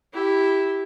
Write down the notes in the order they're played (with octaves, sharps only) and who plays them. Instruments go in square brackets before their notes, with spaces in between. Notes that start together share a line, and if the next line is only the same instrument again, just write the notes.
[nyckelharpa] E4 G4